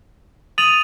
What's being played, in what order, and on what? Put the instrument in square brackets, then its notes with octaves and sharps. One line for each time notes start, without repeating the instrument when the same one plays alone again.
[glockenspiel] D#6 F7 [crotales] A6 D#7 F#7